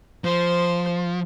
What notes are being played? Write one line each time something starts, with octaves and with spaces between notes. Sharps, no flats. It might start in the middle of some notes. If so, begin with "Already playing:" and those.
F3 C5